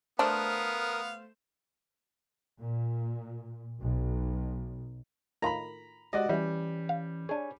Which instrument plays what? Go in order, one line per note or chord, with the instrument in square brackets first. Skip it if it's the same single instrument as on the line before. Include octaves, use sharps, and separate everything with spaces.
[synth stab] A3 C5 E7 [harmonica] B3 F5 [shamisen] D4 [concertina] A#4 D#6
[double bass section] A#2
B1
[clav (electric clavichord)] A2 D#3 F4 [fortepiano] A#5 B5
[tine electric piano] G#3 G4 [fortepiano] F#4 D5 D#5
[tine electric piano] E3 C#4 [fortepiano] G3 [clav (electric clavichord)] E4
[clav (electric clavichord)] F5
[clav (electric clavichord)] D4 G#4 [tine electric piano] C#5 G#5